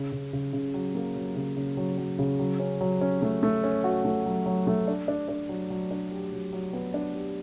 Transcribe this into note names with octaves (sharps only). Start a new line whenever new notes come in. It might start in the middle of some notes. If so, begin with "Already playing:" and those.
Already playing: C#3
C#3
C#3
C#3
F#3
A#3
F#3
C#3
C#3
F#3
F#3
C#3
F#3
C#4
F#3
C#4
A3
A3
C#4
F#4
A3
F#3
F#3
A3
D4
D4
D4
F#3
F#3
D4
G4
F#3
F#3
B3
D4
G4